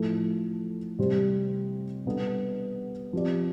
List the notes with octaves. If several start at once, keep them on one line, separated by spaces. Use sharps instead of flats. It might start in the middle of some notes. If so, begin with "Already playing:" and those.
Already playing: A2 F3 A3 E4 A4
C3 G3 C4 G4 C5
B2 G3 B3 D4 A4
F3 C4 G4 D5